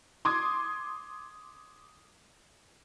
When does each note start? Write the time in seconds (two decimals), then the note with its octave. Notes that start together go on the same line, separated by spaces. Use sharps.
0.25 C6 D6 D#6 G#6